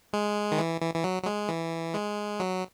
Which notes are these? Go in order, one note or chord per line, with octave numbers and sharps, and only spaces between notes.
G#3
D#3
E3
E3
E3
F#3
F#3
G#3
E3
G#3
F#3